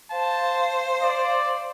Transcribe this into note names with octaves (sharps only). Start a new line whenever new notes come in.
C5 F5 A5
D5